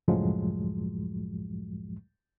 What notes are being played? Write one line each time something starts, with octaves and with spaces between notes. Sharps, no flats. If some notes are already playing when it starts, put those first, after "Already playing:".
C#2 F#2 A2 F3 F#3 G#3